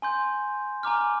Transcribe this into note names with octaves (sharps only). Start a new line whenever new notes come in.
G#5 C6 G6
G#5 A#5 D6 F6